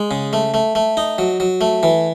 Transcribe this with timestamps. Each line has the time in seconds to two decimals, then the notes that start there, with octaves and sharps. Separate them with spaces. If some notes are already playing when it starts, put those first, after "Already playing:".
Already playing: G#3
0.11 C#3
0.33 A3
0.54 A3
0.75 A3
0.97 D#4
1.18 F#3
1.40 F#3
1.61 A3
1.83 E3